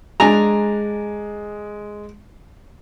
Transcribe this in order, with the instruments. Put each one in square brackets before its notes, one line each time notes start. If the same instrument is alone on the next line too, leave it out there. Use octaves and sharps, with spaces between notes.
[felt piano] G#3 [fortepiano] D4 G#5 A#5